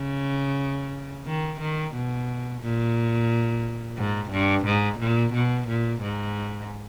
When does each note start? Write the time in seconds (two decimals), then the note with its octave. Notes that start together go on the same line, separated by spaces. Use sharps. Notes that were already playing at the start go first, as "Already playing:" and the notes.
Already playing: C#3
1.26 D#3
1.61 D#3
1.95 B2
2.62 A#2
3.98 G#2
4.31 G2
4.66 G#2
4.99 A#2
5.34 B2
5.68 A#2
6.02 G#2